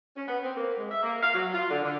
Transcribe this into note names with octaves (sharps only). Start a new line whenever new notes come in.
C#4
B3
C4
A#3
G#3
E5
A#3
F5
F#3
F4
D3
D3